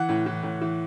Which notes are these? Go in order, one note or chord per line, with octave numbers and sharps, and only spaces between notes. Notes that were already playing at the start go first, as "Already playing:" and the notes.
Already playing: E3 F#5
A2
E3
A2
E3